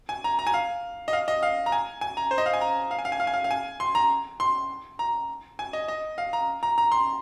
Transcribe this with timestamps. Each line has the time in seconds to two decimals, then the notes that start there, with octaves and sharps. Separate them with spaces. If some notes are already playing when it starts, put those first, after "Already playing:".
0.09 G#5
0.24 A#5
0.39 A#5
0.47 G#5
0.54 F5
1.08 D#5
1.13 F5
1.28 D#5
1.43 F5
1.66 A#5
1.72 G#5
2.01 G#5
2.17 A#5
2.31 C5
2.38 D#5
2.46 F5
2.53 G#5
2.61 A#5
2.91 F5
2.99 G#5
3.05 F5
3.12 G#5
3.20 F5
3.27 G#5
3.33 F5
3.44 F5
3.51 G#5
3.80 C6
3.95 A#5
4.40 C6
4.99 A#5
5.59 G#5
5.73 D#5
5.88 D#5
6.18 F5
6.33 A#5
6.63 A#5
6.78 A#5
6.92 C6